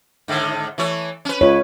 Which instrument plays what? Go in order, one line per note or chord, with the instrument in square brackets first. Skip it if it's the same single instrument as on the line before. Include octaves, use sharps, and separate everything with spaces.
[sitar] G#2 D3 D#3
E3 A3 C#5
C#4 B4
[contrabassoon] C#2 [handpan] C#5